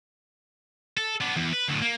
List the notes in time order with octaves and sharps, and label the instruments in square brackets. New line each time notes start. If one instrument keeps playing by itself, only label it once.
[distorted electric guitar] A4
B3 D4
E2
B4
D2 A2
A#3